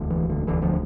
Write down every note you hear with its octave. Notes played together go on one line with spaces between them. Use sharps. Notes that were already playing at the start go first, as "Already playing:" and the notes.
Already playing: E1 D2 D3
E3
D3
E1 D2 D3 E3
D3 F3